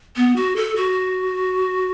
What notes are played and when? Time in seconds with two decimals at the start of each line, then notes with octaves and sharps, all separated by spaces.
0.16 B3
0.36 F#4
0.56 A4
0.76 F#4